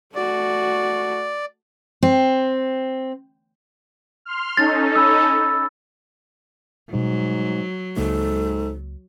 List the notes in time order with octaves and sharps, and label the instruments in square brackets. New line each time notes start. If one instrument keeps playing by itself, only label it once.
[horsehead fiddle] A3 F#4 [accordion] D5
[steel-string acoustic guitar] C4
[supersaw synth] C6 F6
[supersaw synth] C#4 D#4 A4 [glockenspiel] A6
[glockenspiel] B5 E6
[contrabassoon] G#2 [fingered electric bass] B2 G3 [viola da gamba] F#3
[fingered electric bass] C#2 C#3 A#3 [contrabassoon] G#2 [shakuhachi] A4